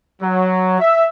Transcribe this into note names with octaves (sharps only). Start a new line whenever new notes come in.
F#3
E5